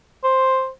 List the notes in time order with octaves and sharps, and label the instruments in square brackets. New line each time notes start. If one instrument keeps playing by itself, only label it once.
[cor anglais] C5